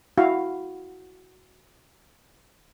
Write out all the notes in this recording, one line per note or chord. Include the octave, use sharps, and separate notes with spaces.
E4 F#4 F5